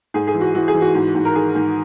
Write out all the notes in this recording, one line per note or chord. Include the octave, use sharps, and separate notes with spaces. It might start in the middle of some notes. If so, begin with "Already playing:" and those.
G#2 G#4
G#4
E3
F#4
E3 F#4
G#4
E3
F#4
G#2
G#2
A#4
D#3 G#4
G#2